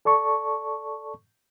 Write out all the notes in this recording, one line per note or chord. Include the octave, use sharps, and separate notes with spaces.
A4 D5 A5 C#6